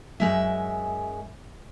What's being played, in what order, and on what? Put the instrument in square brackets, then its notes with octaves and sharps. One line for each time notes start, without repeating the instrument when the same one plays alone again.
[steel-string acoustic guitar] F#2 G#3 E5